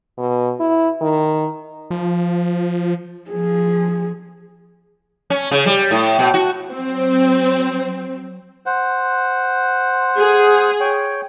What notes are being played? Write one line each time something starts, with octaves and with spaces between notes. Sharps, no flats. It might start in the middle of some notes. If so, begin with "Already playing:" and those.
B2
E4
D#3
F3
F3 G#4
C#4
C#3
G3
A2
B2
F#4
F#3 C4
C5 F#5
G#4
C#5 G5